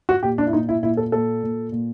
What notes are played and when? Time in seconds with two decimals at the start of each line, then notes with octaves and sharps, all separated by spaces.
0.09 F#4
0.23 A#2 G4
0.38 D4
0.47 E4
0.53 A#2 D#4
0.69 E4
0.83 A#2 E4
0.97 A4
1.12 A#2 A4
1.43 A#2
1.72 A#2